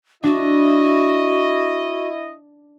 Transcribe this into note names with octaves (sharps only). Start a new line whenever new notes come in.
D4 E4 F#4 D#5